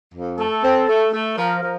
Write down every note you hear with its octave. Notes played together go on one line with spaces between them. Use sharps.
F2
A3 A4
C4
A3
A3
F3 A#4
F3